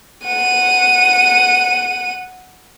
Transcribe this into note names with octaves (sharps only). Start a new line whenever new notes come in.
F#5 D#7